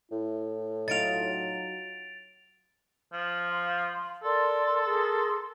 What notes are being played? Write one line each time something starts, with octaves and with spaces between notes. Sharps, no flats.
A2 E4
F#3 D#4 F4 A6 D7 F7
F3
F5 C6
A4 A#4 D5 C6
G#4 A#4 C6